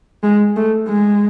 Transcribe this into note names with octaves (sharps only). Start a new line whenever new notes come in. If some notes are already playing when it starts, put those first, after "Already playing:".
G#3
A3
G#3